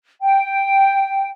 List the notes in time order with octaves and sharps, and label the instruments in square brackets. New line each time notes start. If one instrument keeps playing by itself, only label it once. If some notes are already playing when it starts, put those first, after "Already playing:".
[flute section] G5